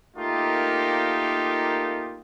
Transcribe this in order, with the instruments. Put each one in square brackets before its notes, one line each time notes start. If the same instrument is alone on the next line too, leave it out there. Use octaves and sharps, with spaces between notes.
[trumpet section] A3 A#3 D#4 F4 G4 A#4